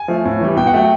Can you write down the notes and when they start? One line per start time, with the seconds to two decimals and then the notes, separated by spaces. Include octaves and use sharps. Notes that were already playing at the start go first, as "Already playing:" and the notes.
Already playing: G#5
0.08 F3 A3
0.25 A2
0.41 E3 G3
0.57 B2 G5
0.67 F#5
0.74 F#3 A3 G5